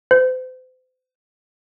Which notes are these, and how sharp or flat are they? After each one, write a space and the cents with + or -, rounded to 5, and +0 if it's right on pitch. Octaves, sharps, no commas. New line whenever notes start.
C5 -40